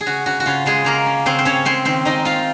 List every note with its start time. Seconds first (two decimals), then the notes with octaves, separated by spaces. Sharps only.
0.01 G#4
0.06 C#3 F#4
0.26 C#3 F#4
0.40 F#4
0.46 C#3 F4
0.66 C#3 G#3 G#4
0.85 C#3 A#3 A#4
1.06 C#4
1.26 C#3 C4 C5
1.39 C5
1.45 C#3 C#4 C#5
1.65 G#3 C4 C5
1.85 D#3 C4 C5
2.05 D#3 D#4 D#5
2.25 D#4 F4 F5